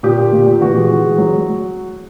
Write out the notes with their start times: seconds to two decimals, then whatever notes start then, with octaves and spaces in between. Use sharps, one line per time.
0.03 A#2 G4
0.19 A#2
0.33 A#2
0.46 A#2
0.61 E3 F#4
0.75 G#3
0.90 E3
1.04 G#3
1.18 F#3